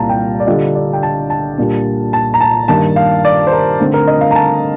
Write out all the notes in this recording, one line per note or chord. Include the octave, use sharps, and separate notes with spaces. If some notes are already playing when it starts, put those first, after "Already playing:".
Already playing: C2 A#2 G3 A#3 F4 A5 A#5
G5
F5
D5
D3 G3 D4 F4 A4 D#5
D5
G5
A5
A5
A#2 G3 D4
A5
A#5
A5
G2 D#3 A#3 D4 A5
F5
D5
C5
A#4
D3 A3 C4 D#4
A#4
D#5
F5
A#5
A5